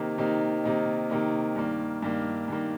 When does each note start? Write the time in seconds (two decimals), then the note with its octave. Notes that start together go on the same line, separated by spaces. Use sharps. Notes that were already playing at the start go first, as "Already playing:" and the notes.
Already playing: C3 D#3 A#3 D#4
0.18 C3 D#3 A#3 D#4
0.64 C3 D#3 A#3 D#4
1.10 C3 D#3 A#3 D#4
1.56 G2 D#3 A#3
2.03 G2 D#3 A#3
2.48 G2 D#3 A#3